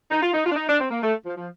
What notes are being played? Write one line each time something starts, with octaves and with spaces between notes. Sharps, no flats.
D#4
F4
D#4
F4
D4
D#4
D4
C4
A#3
A3
F3
F3